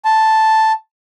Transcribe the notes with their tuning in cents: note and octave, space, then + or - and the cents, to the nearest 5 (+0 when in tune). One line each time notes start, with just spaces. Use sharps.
A5 +0 C6 +0